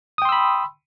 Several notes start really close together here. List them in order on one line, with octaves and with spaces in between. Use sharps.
D#6 G5 C6 E6 B5